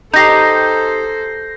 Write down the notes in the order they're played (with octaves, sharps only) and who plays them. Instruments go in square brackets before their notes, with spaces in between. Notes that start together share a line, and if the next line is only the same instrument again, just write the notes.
[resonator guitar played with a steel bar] D#4 G4 [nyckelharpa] A4 C5 [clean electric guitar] A#5 [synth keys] G6 A#6 C7